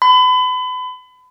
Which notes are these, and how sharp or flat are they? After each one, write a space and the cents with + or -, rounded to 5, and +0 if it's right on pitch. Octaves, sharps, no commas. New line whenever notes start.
B5 +35